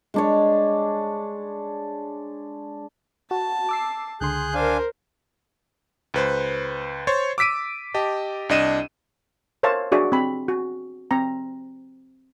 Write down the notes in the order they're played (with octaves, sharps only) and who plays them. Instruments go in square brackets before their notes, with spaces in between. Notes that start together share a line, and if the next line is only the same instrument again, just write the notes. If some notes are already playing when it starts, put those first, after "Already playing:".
[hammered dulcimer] G#3 D4 C#5
[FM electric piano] F#4 [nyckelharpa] A5
[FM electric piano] D6 E6 C7
[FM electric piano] C#2 D3 C6 [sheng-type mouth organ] G#4 F#6 G6
[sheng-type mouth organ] D4 F5 G#5 [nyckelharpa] A#4 C5
[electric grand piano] C#2 B4 C5
C5 C#5 C6 C#6 A6
D6 E6 B6 D7 D#7
G4 D#5 A5
C2 D4 D#5 D#7 E7
[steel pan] A#4 C5 C#5 E5 F5 A5
D4 F#4 G#4 D5 E5
C4 B5
F#4
C4 A#5